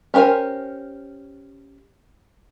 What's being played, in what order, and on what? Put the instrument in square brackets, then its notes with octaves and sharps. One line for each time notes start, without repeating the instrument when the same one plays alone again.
[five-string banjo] C#4 G4 A#4 C5 G#5